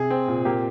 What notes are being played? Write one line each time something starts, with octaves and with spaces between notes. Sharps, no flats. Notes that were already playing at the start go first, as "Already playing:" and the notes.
Already playing: C3 G#4
C4
A#2
A#3 G4